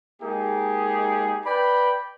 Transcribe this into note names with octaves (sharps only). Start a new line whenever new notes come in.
G#3 A#3 D#4 G4 G#4
B4 D5 G5 B5